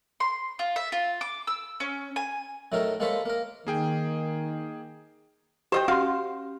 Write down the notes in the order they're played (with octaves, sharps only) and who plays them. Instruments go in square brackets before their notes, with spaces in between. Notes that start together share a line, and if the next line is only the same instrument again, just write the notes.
[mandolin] C6
F4
E5
F4
D6
E6
C#4
G#5
[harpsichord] A2 F#3 A3 D#4 A#4
G#3 A#3 A4 C5 C#5 B5
A#3 A#4
[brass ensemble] D#3 [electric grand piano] A#3 G#4 G5
[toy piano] G4 [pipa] C5 D#5 G5
[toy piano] C#4 C6 [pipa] F#4 F5